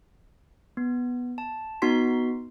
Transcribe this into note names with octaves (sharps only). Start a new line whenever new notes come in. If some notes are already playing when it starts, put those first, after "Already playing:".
B3
A5
B3 D#4 F#4 C6 B6